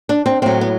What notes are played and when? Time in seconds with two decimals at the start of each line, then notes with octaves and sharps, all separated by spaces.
0.09 D4
0.26 C4
0.42 A2 F#3 C4
0.61 B3